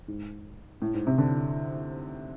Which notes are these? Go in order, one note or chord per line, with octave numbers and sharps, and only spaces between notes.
G#2
A2
G#2
C3
D3